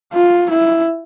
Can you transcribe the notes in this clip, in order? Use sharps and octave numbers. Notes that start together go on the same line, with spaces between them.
F4
E4